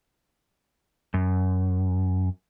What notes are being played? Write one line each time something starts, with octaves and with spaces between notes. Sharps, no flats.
F#2